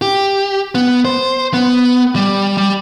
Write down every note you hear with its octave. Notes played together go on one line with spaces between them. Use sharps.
G4
B3
C5
B3
G3
G3